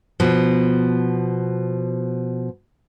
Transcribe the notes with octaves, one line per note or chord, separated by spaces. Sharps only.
B2 F3